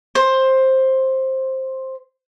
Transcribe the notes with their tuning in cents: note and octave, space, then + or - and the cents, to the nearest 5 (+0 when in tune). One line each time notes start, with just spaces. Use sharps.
C5 +10